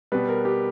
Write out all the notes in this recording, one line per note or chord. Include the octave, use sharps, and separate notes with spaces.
B2 G3 B4
A#4
G4